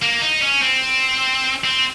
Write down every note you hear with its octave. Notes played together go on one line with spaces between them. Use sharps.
A#3
D#4
C#4
C4
C4